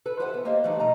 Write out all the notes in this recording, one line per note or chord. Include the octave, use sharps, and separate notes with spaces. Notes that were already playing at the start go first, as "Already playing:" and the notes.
A4 B4
G4 B4 C5 E5 F#5 G#5
B3
A#3 G4 C5 D#5 F5
E3 G3 A3 D4 D#4 C5
B2 D#5 A#5